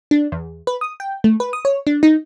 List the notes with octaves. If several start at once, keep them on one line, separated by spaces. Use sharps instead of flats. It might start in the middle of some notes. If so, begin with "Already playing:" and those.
D4
E2
B4
D#6
G5
A3
B4
D#6
C#5
D4
D#4